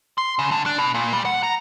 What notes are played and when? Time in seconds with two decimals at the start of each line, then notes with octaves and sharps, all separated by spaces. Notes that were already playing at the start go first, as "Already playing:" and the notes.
0.18 C6
0.39 C#3
0.51 D3
0.66 D4
0.78 B2
0.94 A#2
1.13 G3
1.25 F#5
1.43 A#5